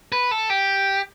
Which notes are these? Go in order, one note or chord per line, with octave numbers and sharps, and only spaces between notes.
B4
A4
G4